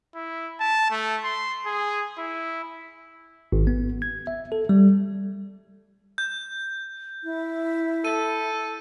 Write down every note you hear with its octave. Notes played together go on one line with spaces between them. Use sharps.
E4
A5
A3
C6
G#4
E4
G#1
B3
G#6
E5
A4
G3
G6
E4
A4 D#7